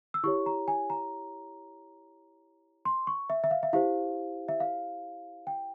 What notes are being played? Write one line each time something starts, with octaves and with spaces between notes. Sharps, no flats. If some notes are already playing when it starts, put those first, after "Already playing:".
E6
E4 G4 C#5 C#6
A#5
G#5
A#5
C6
C#6
E5
E5
F5
E5
E4 G4 C5 F5
E5
F5
G5